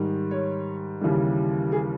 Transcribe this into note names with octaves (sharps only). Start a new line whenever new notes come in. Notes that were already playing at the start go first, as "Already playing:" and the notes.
Already playing: G#2 D#3 G3
C#5
D#2 C#3 E3 G3
G#4